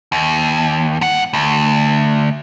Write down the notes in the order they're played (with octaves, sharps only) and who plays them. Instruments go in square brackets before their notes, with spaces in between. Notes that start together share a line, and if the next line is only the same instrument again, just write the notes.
[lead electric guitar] D#2
G2 F#5
D2